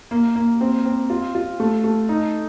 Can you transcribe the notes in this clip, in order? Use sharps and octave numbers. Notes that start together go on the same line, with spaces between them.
A#3
A#3
C4
C4
F4
F4
A3
A3
D#4